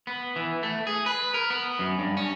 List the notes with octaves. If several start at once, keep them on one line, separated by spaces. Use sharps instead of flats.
B3
E3
A3
G#4
B4
A#4
B3
F#2
G2
C#4